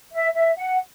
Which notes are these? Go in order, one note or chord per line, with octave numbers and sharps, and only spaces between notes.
E5
E5
F#5